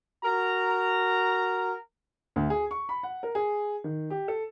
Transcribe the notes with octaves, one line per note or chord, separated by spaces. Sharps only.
F#4 A#4 A#5
D2
G#4
C#6
B5
F#5
A#4
G#4
D#3
G4
A4